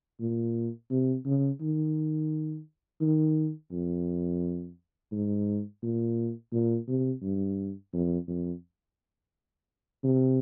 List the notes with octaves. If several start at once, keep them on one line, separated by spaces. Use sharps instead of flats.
A#2
C3
C#3
D#3
D#3
F2
G#2
A#2
A#2
C3
G2
F2
F2
C3